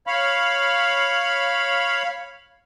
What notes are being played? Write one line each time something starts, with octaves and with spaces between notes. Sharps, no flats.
C#5 F5 B5